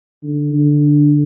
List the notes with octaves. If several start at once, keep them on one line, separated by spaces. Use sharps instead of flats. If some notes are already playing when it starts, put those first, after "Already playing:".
D3
D3